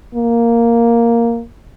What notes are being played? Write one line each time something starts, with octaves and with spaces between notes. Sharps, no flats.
A#3